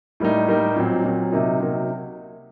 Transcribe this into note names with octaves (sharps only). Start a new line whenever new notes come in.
A2 G3 A#3 D#4
A2 G3 A#3 D#4
A#2 F#3 C4
A#2 F#3 C4
C3 F#3 A#3 D#4
C3 F#3 A#3 D#4